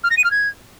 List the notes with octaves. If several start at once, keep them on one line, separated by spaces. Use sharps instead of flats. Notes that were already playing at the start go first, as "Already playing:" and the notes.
F6
A#6
D#7
F6
G#6